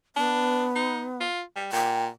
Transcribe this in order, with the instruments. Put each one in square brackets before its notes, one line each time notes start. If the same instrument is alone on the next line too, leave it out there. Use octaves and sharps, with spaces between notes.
[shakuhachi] B3 [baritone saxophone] D4
[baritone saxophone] D#4
F4
G3
[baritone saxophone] A#2 [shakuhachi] G5